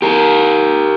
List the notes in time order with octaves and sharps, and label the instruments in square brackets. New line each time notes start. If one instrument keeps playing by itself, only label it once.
[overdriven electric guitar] G4 A#4